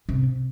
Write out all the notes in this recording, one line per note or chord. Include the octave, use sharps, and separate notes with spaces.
C3